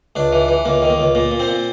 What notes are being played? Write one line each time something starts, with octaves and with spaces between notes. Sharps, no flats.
C#2 D4
E3
E3
C#2 A#3
D#3
A#3
C#2
A#2 A#3
A#2
C4
A#2